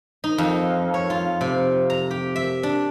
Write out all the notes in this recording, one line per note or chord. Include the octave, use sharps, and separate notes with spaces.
D#4
F2
C#5
F4
C3
A#5
G4
E5
D4